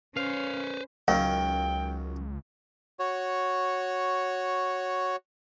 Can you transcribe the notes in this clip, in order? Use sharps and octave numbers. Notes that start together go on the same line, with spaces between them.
C#4 B4 C5 F5
C#2 F#2 D#3 F#3 F5 G5
F#4 C#5